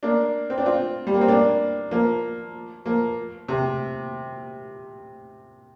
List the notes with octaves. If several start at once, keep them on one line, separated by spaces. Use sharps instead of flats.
A#3 D4
C4
D4
C4 F4
G3
A#3
C4
A#3 D4
F3 A#3
F3 A#3
C3